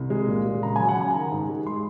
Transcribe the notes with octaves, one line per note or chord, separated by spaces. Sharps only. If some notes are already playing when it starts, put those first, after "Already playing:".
Already playing: C2
G#3
A#2
G#3
C#3 A#5
G#5
F#3
F#5
C#3 G#5
D#3 A#5
G#2
G#3
G#3 C6